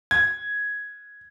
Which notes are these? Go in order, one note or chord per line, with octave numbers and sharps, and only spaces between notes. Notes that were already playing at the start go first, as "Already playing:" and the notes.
G#6